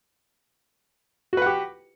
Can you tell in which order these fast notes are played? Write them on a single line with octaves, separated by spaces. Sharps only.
F#4 B4 F#5 G4